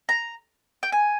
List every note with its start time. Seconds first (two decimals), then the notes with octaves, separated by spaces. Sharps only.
0.09 A#5
0.83 G5
0.92 G#5